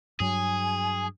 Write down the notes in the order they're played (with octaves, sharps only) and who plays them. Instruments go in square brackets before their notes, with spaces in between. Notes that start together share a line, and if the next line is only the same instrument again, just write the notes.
[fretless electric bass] G2 F#3 [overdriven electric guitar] G#4 [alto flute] G#5